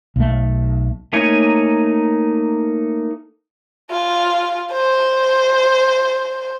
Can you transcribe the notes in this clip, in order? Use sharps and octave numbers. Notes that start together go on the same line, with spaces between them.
B1 A3
A3 A#3 D#4 C#5 G#5
F4
C5